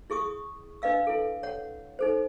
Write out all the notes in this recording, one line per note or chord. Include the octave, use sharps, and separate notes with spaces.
E4 G#4 C#6 D#6
D4 B4 D#5 F5 E6
E4 A4
C#5 F#5
D#4 A4 C5